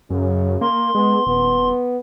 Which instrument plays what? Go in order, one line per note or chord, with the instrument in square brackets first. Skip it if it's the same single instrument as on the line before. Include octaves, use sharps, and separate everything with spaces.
[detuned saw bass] F#2 [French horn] C#3
[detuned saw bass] A#3 [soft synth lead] C6
[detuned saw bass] G#3 [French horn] B3
[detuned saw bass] D#1 [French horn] B3